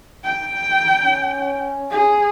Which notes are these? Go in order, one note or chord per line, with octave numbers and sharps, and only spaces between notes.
G5
C#4
G#4